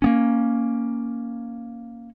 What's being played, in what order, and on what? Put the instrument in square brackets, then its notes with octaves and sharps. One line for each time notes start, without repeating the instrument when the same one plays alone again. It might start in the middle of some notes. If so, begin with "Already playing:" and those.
[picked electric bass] A#3 B3 C#4